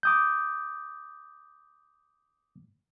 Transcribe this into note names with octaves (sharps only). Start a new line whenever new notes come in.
D6 D#6 G6